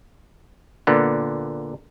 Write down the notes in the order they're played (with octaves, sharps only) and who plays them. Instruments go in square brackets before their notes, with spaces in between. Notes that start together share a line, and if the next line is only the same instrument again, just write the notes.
[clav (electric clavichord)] A#2 D3 B3